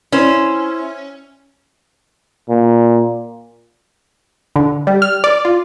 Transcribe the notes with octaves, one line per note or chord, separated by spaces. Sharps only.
C#4 E4 C5 E5
A#2
D3
G3
F6
D5
F4